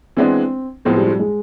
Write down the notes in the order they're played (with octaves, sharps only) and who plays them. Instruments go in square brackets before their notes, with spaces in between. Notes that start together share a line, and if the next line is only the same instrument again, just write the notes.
[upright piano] E3 G#3 B3 D4 [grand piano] C4
[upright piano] A2 F3 G#3 C4 [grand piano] B3
[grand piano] G3
G3
G#3